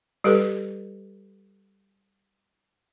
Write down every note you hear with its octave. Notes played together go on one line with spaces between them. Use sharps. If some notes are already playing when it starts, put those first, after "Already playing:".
G3 G4 A4 B4